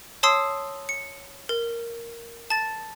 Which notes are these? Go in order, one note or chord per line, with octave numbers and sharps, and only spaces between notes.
C#5 A5 C6 D#6 E6 C7
C#7
A#4
A5 A6